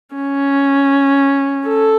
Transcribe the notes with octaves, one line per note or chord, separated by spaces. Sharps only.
C#4
A4